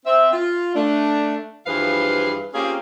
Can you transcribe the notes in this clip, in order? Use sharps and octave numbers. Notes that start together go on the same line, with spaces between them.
C4 E5
F4
A3 D4
G2 E3 F3 G#4 B4 F5
A#3 C4 C#4 F4 G4 G#4